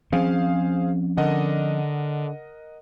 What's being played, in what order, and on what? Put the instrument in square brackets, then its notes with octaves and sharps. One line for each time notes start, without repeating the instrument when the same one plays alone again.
[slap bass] F3 C4 C#4 [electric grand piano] G#4 C5 F5
[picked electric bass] D3 [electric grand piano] A#4 D#5 F#5